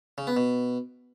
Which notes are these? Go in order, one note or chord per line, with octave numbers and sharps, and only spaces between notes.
C#3
B3
B2